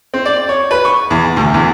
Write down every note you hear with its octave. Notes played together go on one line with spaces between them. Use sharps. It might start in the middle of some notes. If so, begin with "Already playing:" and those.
C4
D5
C#5
B4
C#6
E2
D2
E2